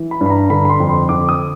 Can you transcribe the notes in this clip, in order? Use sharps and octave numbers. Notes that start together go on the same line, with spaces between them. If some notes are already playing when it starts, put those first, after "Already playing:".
Already playing: E3
B5
G2
B5
A#5
D3 B5
B5
C6
F2
C6
D3 D6
D#6